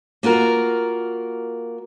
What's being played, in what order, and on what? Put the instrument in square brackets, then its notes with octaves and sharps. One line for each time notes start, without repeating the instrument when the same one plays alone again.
[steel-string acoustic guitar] A#3 F4 F#4 A#4